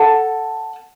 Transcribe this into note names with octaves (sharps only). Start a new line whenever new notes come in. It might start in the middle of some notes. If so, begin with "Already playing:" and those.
Already playing: A4 F#5 A5